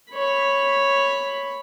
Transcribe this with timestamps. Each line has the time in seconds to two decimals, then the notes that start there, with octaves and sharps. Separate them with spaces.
0.12 C#5 B5